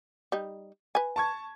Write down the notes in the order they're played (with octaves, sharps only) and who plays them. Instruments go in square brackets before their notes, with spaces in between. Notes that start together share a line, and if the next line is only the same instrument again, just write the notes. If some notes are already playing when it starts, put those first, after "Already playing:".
[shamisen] G3 D#4
B4 G#5
[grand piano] A5 C#6 G#6